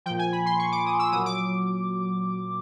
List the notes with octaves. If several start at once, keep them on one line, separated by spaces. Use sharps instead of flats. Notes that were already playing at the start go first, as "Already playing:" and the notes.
A#2 F3 G5
G#5
B5
C6
C#6
D6
D#6
E6
A#2 F#3 D#6
D6